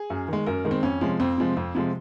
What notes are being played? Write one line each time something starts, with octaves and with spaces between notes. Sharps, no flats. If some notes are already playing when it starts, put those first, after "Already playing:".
Already playing: G#4
F#2
D#3 G#3
F#2 A#4
D#3 G#3
C4
F2 C#4
C3 F3 G#3
F2 C4
C3 F3 G#3
F2
C3 F3 G#3